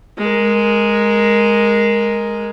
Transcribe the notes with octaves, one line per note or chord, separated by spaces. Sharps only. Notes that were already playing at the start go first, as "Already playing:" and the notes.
G#3 A#4